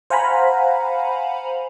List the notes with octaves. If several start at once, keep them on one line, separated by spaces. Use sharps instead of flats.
C5 F5 F#5 G#5 A#5 B5